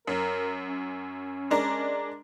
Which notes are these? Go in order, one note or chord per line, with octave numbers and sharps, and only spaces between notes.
F#2 A#4
C#4
G#3 D4 A#4